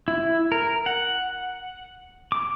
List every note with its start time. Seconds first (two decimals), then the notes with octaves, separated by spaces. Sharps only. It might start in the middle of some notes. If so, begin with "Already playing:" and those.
0.08 E4
0.52 A#4
0.86 F#5
2.32 D6